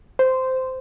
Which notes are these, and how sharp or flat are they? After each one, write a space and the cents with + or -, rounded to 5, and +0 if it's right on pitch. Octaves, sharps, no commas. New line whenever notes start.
C5 -10